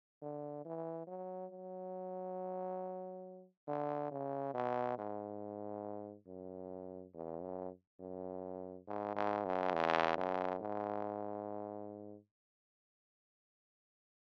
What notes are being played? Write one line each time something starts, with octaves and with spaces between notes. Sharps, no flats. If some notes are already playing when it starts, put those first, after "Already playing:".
D3
E3
F#3
F#3
D3
C#3
B2
G#2
F#2
E2
F#2
F#2
G#2
G#2
F#2
E2
F#2
G#2